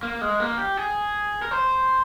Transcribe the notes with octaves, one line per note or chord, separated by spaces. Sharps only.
A#3
G#3
A#3
G4
G#4
A#4
C5